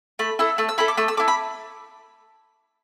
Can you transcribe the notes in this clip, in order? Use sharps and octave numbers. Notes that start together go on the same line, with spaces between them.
A3 B5
E4 A4 E6
A3 E6
E6
E4 A4 B5
D6
A3 E6
E6
E4 A4 D6
B5